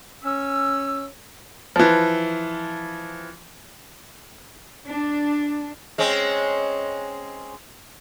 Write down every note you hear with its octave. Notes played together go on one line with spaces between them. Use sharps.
C#4 E6
E3 F3
D4
G#3 C4 C#4